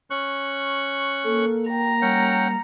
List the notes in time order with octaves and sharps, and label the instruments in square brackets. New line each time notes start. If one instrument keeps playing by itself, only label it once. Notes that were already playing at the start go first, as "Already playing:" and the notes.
[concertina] C#4 C#6 F#6
[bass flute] A#3 [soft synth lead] A4
[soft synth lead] G5 [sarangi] A#5
[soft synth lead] G3 [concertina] C#4 F#5 G5